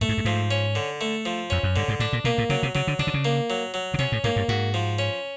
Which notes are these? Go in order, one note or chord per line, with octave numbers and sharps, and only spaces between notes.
A2 A3
G#2
G2
G#2 F3
C#4
D3
A3
F3
F2 C#4
F#2
G2 D3
G#2
A2 D4
A#2
B2 A#3
A2
C#3 F#3
C3
C#3 F#3
D3
C#3 D4
D3
C#3
A#3
F#3
F#3
C#3
C3 C#4
A2
G#2 A#3
G2
G#2 F#4
F3
C#4